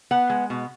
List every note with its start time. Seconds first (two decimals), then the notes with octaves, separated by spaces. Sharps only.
0.11 B3 F#5
0.30 G#3
0.50 B2